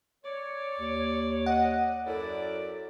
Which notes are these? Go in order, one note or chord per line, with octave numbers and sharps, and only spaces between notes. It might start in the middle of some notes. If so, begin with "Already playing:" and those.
C#5 D5
D#2
D#5 F#5
F#2 E4 A4 D5